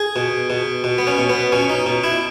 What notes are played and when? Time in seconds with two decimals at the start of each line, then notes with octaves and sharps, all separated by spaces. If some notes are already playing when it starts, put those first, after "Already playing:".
Already playing: G#4
0.16 B2
0.50 B2
0.84 B2
0.98 B3
1.07 C#4
1.18 B2
1.29 B3
1.52 B2 C#4
1.70 D#4
1.86 B2
2.04 E4